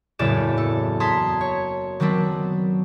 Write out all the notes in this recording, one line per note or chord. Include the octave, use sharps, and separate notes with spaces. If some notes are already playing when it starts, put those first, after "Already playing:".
F#1 E2 A2 C#5 D5 E7
A4
A5 A#5 C6 D#6 G#6 B6
C#5
D#3 F#3 B3 C4 D4